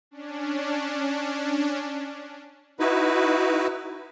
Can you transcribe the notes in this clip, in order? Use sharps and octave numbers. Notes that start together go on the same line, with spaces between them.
C#4 D4
D#4 E4 F#4 B4